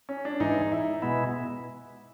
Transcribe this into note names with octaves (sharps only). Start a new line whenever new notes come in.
C#4
D4
G#2 E3 G#3 D#4
E4
B2 G#3 B3 E4